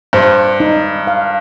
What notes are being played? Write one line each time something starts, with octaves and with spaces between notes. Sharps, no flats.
G2 C5
D#4
F5